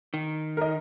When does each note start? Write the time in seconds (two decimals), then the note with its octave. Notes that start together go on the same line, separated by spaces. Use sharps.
0.14 D#3
0.57 A#4 D#5